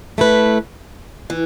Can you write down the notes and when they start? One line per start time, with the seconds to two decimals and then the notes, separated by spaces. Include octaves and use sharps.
0.18 A3 E4 B4
1.30 E3